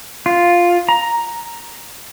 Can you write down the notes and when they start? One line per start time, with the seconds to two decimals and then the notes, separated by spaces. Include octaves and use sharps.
0.26 F4
0.89 A#5